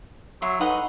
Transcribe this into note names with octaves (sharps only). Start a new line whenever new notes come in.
F#3 E5 C6
D#4 A4 B4 D#5 F#5